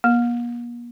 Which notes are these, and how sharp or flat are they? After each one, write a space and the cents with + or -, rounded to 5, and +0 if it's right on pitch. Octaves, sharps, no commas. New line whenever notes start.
A#3 +45